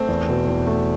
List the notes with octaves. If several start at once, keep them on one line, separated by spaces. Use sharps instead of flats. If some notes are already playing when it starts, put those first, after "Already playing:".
Already playing: A3 C4
E2
B2
E2
A3